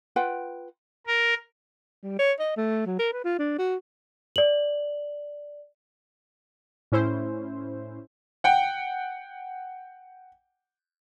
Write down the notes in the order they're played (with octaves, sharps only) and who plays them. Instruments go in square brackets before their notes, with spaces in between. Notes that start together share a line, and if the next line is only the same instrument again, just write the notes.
[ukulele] F4 B4 F#5 G5
[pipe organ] A#4
[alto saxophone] G3
C#5
D#5
A3
F#3
A#4
B4
F4
D4
F#4
[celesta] D5 F#7
[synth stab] A2 C#4 E4 C5
[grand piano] F#5 G5